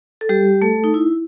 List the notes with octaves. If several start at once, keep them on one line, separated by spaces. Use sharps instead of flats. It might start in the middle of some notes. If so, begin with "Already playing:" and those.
A4
G3 G4
A3 A4
D#4
E4